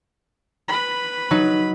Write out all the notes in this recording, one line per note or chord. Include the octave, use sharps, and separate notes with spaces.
B4 B5
F#3 D#4